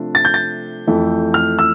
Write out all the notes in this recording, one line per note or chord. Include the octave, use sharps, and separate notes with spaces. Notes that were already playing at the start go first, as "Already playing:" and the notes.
Already playing: C3 F3 A3 D4
A6
G6
A6
F2 E3 A3
F6
E6